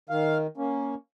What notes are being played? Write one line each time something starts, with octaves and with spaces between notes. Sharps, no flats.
D#3 F5
A#3 C#4